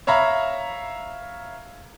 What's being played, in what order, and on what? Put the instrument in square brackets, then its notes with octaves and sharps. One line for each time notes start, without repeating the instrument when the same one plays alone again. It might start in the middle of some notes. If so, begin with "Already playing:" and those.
[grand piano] C#5 E5 F5 A#5 B5